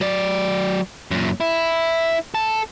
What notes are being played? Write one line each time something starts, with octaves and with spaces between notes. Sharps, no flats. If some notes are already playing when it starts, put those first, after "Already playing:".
F#3 D5
F#2 A#2
E4
A4